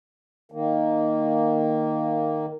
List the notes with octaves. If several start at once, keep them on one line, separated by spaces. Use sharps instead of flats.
D#3 A#3